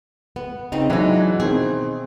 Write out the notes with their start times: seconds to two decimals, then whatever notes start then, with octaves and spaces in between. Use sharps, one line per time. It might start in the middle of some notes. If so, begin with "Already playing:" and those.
0.36 B3
0.72 C#3 C4 D#4
0.90 E3 F#3 G#3 D4 D#4
1.40 B2 D#3 C4 G#4